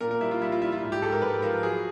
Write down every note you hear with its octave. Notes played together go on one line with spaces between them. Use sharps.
A#2 A#4
A#4
G3 E4
F4
G3 E4
F4
G3 E4
F4
G#2
G4
G#2 A4
A#4
G#2 B4
F3 A#4
F#3 G#4